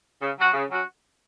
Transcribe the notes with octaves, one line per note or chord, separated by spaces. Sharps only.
C#3
F#3 C#4 F#4
C#3
F#3 C#4 F#4